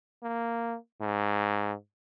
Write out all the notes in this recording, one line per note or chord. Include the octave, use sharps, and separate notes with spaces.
A#3
G#2